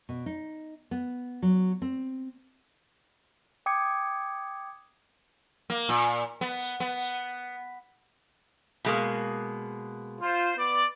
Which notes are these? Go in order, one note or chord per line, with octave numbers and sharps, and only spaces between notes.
B2
D#4
B3
F#3
C4
G5 D6 D#6 G#6 C#7
A#3
A#2
B3
B3
B2 G#3 A#3
F4 C5
B3 D5